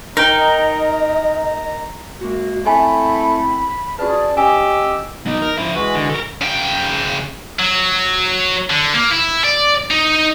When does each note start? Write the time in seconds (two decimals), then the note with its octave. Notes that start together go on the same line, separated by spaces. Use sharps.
0.17 D#4 A#4 D#5 G5 A#5
2.20 F#2 G#3 A#3 F#4
2.66 A3 C4 E4 C#5 G#5 B5
3.99 C#4 F#4 G#4 B4 D5 A5
4.37 C#4 G4 D#5 G#5 E6
5.26 F#3 B3 D#4
5.42 A#4
5.58 F3 C#4 E4 E5
5.75 E3 G#3 F#4 B4
5.95 D3
6.10 A4 A#4
6.42 C#3 G5
7.59 F#3
8.70 D3
8.95 A#3
9.11 E4
9.44 D5
9.91 D#4